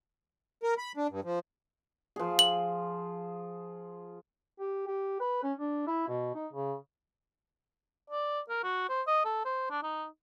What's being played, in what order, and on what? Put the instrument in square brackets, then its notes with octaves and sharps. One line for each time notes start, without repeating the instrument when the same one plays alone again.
[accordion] A#4
B5
D4
G2
F3
[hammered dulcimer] F3 G#4
[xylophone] F#7
[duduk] G4
G4
B4
C#4
D4
E4
B2
D#4
C#3
[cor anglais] D5
A#4
F#4
C5
D#5
A4
C5
D4
D#4